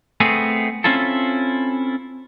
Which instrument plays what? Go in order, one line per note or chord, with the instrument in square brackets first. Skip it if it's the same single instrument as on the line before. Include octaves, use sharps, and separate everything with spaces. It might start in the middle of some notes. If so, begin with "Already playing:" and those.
[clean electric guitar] A3 B3 C4 G#4
C4 C#4 E4 F4 A4